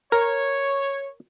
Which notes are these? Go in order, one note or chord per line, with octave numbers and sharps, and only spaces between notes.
A#4 C#5